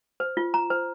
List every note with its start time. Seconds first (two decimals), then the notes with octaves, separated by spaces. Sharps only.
0.20 C5
0.37 F4
0.54 A#5
0.70 C5